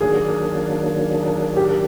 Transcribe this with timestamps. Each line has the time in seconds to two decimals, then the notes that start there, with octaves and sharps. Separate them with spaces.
0.01 D#3 F#3 A#3 D4 G#4
1.57 G4